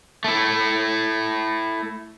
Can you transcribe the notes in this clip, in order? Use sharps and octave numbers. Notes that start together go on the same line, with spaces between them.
A3 E4